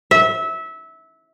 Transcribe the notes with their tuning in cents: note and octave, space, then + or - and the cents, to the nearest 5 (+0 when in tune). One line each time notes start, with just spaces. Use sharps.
E5 -20